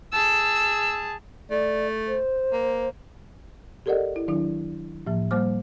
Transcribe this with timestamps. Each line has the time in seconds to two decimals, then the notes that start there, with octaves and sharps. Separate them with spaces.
0.13 G#4 A5 E6
1.50 A3 D5
2.08 C5
2.53 A#3
3.86 G4 A4 A#4 D5 D#5 F#5
4.16 E4
4.28 D#3 F#3 D4 E4
5.07 A2 F3 A#3
5.31 G3 A#3 C5 D6 F6